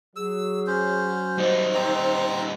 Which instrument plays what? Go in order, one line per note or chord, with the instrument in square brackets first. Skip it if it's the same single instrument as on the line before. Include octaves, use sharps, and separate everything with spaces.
[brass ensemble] F#3 [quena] G#4 [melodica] E6
[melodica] C#4 C5
[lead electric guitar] G3 D#4 [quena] C5
[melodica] C4 A#5